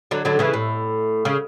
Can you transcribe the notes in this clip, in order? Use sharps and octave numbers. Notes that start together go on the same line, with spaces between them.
D3 F#3
D3 F#3
C#3 E3
A2
C#3